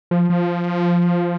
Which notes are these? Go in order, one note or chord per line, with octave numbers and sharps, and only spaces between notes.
F3
F3